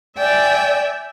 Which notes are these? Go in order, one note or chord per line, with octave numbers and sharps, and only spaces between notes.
D5 E5 G5 G#5